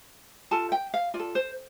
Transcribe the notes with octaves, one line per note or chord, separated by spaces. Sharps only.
F4 A4 A5
G5
F5
F4 D5
A4
C5